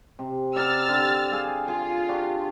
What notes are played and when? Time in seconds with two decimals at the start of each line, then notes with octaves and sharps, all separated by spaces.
0.19 C3
0.56 D5 F#5 A#5 E6 F6 A6
0.89 D3 G4
1.31 G#4 F5 G5
1.68 F4 G#4
2.09 D4 F#4 G4